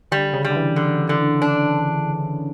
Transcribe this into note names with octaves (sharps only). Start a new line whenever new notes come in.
D3 G3
C#3
G3
D3
E3
D3
D3
D4